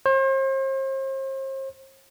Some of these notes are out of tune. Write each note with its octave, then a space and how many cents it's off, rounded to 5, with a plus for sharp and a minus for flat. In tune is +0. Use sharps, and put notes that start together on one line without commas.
C5 +40